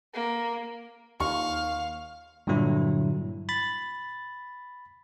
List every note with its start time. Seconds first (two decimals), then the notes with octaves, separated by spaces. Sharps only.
0.14 A#3
1.20 D#2 F5 C#6
2.47 G2 A#2 D3 F#3 E4
3.49 B5 A6